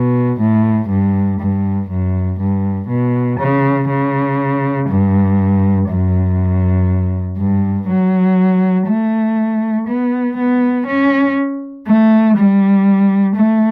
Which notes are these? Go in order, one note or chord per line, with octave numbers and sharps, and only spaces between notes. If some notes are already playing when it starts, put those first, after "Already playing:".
Already playing: B2
A2
G2
G2
F#2
G2
B2
C#3
C#3
G2
F#2
G2
F#3
A3
B3
B3
C#4
A3
G3
A3